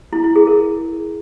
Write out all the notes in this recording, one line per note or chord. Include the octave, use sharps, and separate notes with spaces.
E4
E4
G#4
A#4